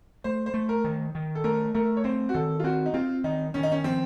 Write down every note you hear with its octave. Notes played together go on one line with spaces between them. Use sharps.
A3 C5
C5
A3
A#4
D#3
D#3
A4
A3 A#4
A3 A#4
C#5
C4 C5
F#4
D#3 A4
F4
C4 F#4
D#4
C4 F4
D#3 D#4
D#3 C#4
D#4
C#4
F3 C4